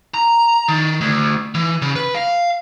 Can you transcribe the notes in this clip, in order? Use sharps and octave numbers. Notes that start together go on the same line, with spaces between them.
A#5
D#3
D2
E3
C#3
B4
F5